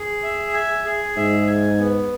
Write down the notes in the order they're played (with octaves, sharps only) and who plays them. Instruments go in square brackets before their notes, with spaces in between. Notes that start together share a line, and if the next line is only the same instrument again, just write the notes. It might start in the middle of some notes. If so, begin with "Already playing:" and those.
Already playing: [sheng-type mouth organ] G#4
E5
G#5
G#4
[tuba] G#2 [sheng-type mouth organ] E5
[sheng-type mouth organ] G#5
B3